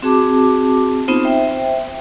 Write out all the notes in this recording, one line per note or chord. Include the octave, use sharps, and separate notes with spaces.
C4 F#4 G#4 A5 D6
B3 C4 D#4 F4 C5
C5 E5 G5